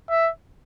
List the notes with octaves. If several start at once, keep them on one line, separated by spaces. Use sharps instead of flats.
E5